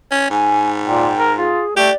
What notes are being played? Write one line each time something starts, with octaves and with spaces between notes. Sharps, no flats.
C#4
G#2 G#5
A#2 G5
A#4
F4 G#4
A3 G4 D5